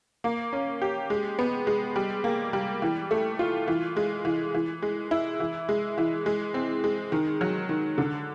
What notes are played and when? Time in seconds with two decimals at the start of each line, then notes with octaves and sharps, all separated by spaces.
0.24 A#3
0.53 C#4
0.82 G4
1.10 G#3
1.39 B3
1.67 G#3
1.96 G3
2.24 A#3
2.53 G3
2.82 E3
3.11 A3
3.39 F4
3.68 E3
3.96 G#3
4.25 E3
4.55 E3
4.82 G#3
5.11 E4
5.40 E3
5.69 G#3
5.98 E3
6.26 G#3
6.54 C4
6.84 G#3
7.12 D#3
7.41 F#3
7.69 D#3
7.98 D3